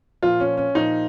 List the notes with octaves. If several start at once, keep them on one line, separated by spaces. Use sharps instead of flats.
A#2 F3 F4
C#4
C#4
A#2 F3 D#4